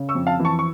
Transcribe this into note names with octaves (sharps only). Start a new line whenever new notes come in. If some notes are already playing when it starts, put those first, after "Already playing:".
Already playing: C#3
C#6 E6
F2
F5 A5
E3
A5 C#6
C#6